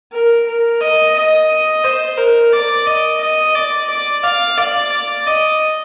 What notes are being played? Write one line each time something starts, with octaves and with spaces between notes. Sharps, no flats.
A#4
A#4
D#5
D#5
C5
A#4
D5
D#5
D#5
D5
D5
F5
D5
D5
D#5